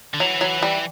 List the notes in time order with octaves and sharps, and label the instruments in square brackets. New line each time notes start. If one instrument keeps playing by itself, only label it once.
[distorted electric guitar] D3
[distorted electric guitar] E3 [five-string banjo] F#3
[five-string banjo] F#3
G3